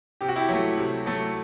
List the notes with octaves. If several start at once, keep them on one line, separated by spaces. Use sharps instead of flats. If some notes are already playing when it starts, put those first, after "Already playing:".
C3 G4
F#4
E4 G4
F#3 A3
C3
F#3 A3